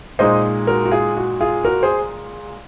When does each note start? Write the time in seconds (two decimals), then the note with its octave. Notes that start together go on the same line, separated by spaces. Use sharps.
0.19 A#2 G#3 D#4 C5 D#5
0.67 F#4 A#4
0.85 F#4
0.91 F4 G#4
1.17 F#4
1.40 F4 G#4
1.65 F#4 A#4
1.83 G#4 C5